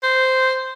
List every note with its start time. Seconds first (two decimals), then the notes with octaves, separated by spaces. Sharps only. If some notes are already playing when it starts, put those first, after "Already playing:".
0.03 C5